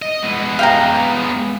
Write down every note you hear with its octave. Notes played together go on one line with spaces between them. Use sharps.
D#5
G#3 B3
F5 G5 A#5